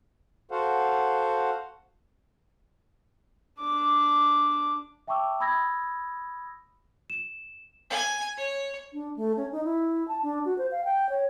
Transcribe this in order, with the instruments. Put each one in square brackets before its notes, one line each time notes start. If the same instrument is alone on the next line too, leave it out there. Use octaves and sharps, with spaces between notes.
[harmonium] F#4 A4 C5 F5 F#5
[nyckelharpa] D4 D6
[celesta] E5 G5 A5 C#6 D6 E6
B5 D#6 E6 G#6 A#6
E7
[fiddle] G#5
C#5
[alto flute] D4
A3
C#4
D#4
E4
A5
D4
F#4
C5
F5
G5
C#5